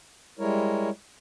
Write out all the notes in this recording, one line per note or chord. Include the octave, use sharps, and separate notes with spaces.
G3 G#3 E4 A#4 C#5